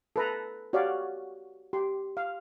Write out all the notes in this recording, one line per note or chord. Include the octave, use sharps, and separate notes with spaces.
A4 B4 A#5
F#4 G4 C#5 D5 F5
G4 C6
F5